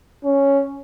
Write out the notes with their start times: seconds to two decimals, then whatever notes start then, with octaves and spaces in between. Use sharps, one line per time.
0.25 C#4